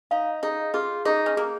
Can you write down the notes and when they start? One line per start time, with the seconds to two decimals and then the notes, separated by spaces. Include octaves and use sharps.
0.11 D#4 F5
0.43 D#4 G#4
0.74 F4 G#4
1.05 D#4 G#4
1.26 C#4
1.37 A#3 G#4